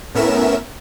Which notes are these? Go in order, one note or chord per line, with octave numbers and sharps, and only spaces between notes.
A2 B3 C#4 A#4 E5 E7